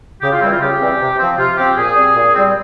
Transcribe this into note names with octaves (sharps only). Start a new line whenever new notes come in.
C#3 G4
F4
E3 G3 C4 E4
F4
C#3 G4
E3 G3 C4
C3
F3 C4
C3 F4
F3 C4 G4
A#2 G#4
G3 C4
A#2
G3 C4